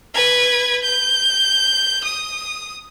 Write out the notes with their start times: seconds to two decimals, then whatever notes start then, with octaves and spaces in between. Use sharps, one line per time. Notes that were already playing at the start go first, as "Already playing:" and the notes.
0.14 B4 G#6
0.83 G6
2.04 D#6